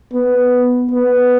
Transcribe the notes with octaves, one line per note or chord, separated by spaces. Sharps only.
B3
B3